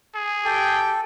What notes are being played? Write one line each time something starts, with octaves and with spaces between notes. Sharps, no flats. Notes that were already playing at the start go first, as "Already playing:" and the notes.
G#4
G4 A4 G5